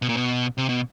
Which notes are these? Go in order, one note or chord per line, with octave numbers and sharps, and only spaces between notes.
B2
A#2
B2
C3
B2